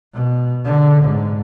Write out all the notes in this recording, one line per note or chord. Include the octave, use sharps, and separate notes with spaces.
B2
D3
G#2